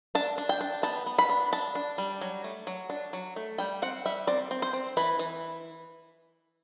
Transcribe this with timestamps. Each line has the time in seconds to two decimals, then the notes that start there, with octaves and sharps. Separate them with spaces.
0.15 D4 A5
0.38 D4
0.49 G5
0.61 D4
0.83 B3 A5
1.06 B3
1.18 B5
1.29 D4
1.53 D4 A5
1.75 D4
1.98 G3
2.21 F#3
2.44 A3
2.67 F#3
2.90 D4
3.13 F#3
3.36 A3
3.58 G3 G5
3.82 C4 F#5
4.05 G3 E5
4.27 C4 D5
4.51 C4
4.62 C5
4.73 C4
4.97 E3 B4
5.19 E3